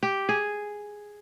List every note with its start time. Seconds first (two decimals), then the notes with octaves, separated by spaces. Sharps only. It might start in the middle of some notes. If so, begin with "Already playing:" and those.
0.03 G4
0.29 G#4